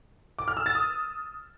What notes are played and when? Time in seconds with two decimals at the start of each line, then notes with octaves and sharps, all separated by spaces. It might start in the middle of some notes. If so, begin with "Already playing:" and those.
0.39 D6
0.48 F6
0.57 E6
0.66 A6
0.75 D#6